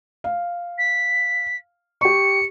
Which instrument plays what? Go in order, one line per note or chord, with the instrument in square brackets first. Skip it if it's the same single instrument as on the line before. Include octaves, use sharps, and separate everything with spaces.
[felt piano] F5
[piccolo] B6
[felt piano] G4 C#6 [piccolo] C#7